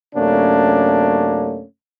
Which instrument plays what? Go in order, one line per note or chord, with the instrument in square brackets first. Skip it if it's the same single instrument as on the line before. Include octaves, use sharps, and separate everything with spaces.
[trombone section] F#2 C3 A3 A#3 C#4 D4